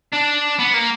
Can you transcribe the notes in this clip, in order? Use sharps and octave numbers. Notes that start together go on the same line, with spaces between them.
D4
B3
A#3